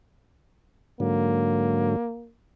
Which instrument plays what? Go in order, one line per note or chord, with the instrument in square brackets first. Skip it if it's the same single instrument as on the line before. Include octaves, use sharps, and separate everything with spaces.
[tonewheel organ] G#2 D3 F#3 [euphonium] A#3